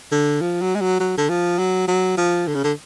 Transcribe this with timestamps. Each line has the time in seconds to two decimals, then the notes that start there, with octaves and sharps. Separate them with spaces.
0.12 D3
0.41 F3
0.61 F#3
0.75 G#3
0.81 F#3
1.00 F#3
1.18 D3
1.29 F3
1.59 F#3
1.88 F#3
2.17 F3
2.47 D3
2.55 C#3
2.64 D3